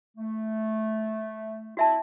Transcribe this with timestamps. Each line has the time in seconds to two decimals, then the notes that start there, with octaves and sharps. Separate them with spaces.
0.17 A3
1.77 C4 E4 F#4 E5 A5